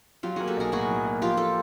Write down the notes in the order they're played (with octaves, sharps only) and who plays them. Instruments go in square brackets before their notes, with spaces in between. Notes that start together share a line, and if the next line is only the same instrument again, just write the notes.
[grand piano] F#3 [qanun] F4 G4
[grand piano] A#3 [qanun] F#4 G#4
[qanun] G4 A4
[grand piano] B1 [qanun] G#4 A#4
[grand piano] A2 [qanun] F#4 G#4
[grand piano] F#3
A#3
[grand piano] F3 [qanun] F4 G4
[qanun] G4 A4